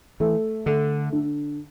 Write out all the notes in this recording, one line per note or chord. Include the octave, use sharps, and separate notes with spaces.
E3 A3
D3 A3
D3